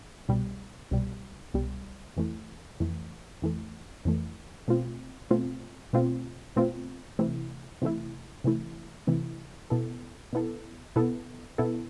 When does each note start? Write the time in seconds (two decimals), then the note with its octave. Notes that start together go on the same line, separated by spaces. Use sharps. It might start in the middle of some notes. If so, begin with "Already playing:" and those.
0.28 C2 B2 G3
0.91 C2 B2 G3
1.54 C2 B2 G3
2.17 F2 E3 A3
2.80 F2 E3 A3
3.42 F2 E3 A3
4.05 F2 E3 A3
4.68 B2 A3 C4 F4
5.30 B2 A3 C4 F4
5.93 B2 A3 C4 F4
6.56 B2 A3 C4 F4
7.19 C3 E3 A3 E4
7.82 C3 E3 A3 E4
8.44 C3 E3 A3 E4
9.07 C3 E3 A3 E4
9.70 B2 B3 E4 A4
10.33 B2 B3 E4 A4
10.96 B2 B3 E4 A4
11.58 B2 B3 E4 A4